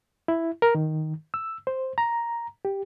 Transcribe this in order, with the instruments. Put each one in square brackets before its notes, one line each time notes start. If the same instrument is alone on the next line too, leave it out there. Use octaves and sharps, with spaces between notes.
[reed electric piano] E4
A#4
D#3
E6
C5
A#5
G4